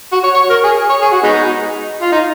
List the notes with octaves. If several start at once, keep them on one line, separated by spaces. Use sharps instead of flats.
F#4
C#5
C#5
A#4
G#4
C#5
G#4
F#4
G#3 B3 D#4
F4
D#4